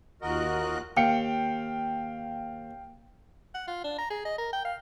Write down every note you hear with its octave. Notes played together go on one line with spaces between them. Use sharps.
D#2 F4 F#4 A#4 D#5 F#6
D#2 F5 G5 C#7
F#5
F4
D4
A#5
G#4
D#5
A#4
G5
F5